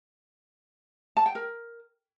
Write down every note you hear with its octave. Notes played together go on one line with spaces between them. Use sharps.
A5
G5
A#4